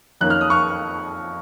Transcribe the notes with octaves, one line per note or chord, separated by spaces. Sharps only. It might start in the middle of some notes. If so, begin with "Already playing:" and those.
F2 D#3 A#3 C#4 F#6
F6
D#6
C#6 F6